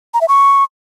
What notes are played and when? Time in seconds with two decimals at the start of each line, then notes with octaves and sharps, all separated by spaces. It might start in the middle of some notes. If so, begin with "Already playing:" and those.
0.14 A#5
0.21 E5
0.28 C#6